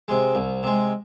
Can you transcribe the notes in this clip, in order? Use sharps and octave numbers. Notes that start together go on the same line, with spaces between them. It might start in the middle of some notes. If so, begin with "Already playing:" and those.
C3 G#3
C2
C3 G#3